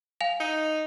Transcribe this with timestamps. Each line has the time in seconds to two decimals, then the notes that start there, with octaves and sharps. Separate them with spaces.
0.21 F5 G#5 F7
0.40 D#4